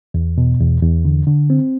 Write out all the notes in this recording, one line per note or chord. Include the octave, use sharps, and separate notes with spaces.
E2
B2
E2
E2
D3
D3
C4